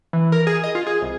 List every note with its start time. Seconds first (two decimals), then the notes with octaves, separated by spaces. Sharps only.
0.13 E3
0.32 A#4
0.47 G#4
0.64 D#5
0.75 F4
0.87 G#4
1.02 C2